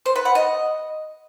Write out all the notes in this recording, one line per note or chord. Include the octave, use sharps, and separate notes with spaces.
C5
B4
F#5
D#5